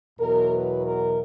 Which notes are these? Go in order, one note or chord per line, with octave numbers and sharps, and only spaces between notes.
E2 B2 F#3 A#4
B4
A#4